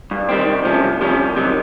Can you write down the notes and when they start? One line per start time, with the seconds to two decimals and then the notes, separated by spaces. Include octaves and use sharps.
0.11 G2
0.29 D#3 G3 C4
0.47 C2
0.65 C3 F3 A3 C#4
0.83 C2
1.01 C3 F3 A3 C#4
1.18 C2
1.36 C3 D#3 F#3